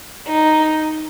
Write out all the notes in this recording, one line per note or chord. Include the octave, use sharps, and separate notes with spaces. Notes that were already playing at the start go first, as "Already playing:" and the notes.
D#4